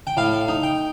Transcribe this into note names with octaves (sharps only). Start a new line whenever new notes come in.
G5
A2 F5
D#4
G5